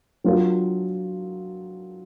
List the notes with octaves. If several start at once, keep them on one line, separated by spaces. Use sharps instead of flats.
F#3 D4 F4 A#4